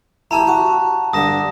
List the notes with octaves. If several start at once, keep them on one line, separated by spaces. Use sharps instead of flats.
E4 G4 A5 A#5
F#4
G2 D3 D#6 A#6 E7